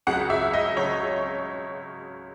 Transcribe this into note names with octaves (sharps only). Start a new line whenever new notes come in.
C#2 C#3 F#3 F#5
E5
D#5
C#2 C#3 F#3 C#5